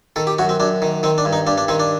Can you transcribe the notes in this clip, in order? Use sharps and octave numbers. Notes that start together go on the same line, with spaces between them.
D#3 A4
G4
F#2 F#4
C4
F#2 D4
D#3
D#3 C4
D4
G2
D#4
G2 D4
D4
D#3 C4
D4